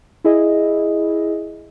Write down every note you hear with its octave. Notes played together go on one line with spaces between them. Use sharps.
E4 G#4 D#5